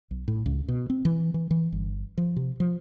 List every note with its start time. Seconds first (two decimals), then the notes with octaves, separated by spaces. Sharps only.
0.11 B1
0.28 A2
0.46 C#2
0.68 B2
0.90 C4
1.05 E3
1.34 E3
1.51 E3
1.72 G1
2.18 F3
2.36 C3
2.60 F3